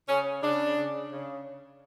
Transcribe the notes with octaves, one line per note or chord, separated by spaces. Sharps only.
C#3 C#4
C#3 D4
C#3
C#3